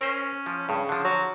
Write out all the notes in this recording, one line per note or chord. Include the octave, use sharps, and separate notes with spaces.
C#4 A#4 C5
F3
G2 C#3
D3 F3
F#3